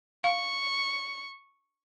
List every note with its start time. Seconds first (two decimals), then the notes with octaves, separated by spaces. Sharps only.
0.24 F5 C#6